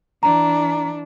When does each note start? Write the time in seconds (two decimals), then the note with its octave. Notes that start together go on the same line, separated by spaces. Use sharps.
0.23 E3 D4 A#5